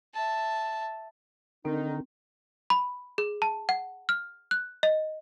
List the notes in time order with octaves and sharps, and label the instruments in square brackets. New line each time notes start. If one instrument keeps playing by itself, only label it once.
[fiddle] E5 A5
[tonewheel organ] D3 [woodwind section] D#3 D#4 [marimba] C4
[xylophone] B5
G#4
A5
F#5
F6
F#6
D#5